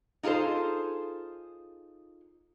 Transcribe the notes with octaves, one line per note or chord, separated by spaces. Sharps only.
D#4 F4 G#4 A4 C5